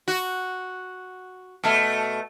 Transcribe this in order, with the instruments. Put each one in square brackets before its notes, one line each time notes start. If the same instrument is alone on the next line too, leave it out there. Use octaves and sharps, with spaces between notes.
[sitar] F#4
B2 A3